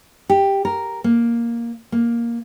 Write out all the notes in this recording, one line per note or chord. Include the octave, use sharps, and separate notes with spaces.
G4
A#4
A#3
A#3